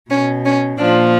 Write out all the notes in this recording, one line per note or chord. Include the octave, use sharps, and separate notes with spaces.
B2 C#4
C#4
A#2 F3 D4